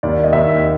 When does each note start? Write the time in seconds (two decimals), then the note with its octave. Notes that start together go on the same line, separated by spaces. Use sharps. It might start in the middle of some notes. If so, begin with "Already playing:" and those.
0.03 D#2 D5
0.24 D#5
0.33 D#2 E5